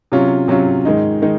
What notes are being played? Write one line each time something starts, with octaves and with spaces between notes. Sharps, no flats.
C3 F#3 C#4 F4
C3 F#3 C#4 F4
G#2 D#3 G#3 D#4
D#3 G#3 D#4